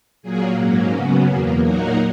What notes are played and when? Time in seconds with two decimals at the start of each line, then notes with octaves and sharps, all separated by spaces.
0.22 A#2 F#3 A#3 G#4
0.58 G#2 F#3 A#3 C#4
0.92 F#2 C#3 F#3 B3 F#4
1.27 E2 B2 A#3 G#4
1.62 A#2 F#3 A#3 D#4 F#4 A#4